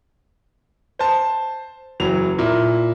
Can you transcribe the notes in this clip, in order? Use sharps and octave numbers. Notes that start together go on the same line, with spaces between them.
C5 A5
F#1 E3 F#3 F7
A#2 E4